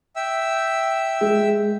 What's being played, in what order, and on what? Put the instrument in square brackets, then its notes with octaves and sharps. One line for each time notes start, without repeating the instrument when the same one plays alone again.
[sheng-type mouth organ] E5 G5 E6
[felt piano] G#3